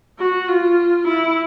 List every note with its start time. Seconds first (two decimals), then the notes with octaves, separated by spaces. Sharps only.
0.19 F#4
0.49 F4
1.07 E4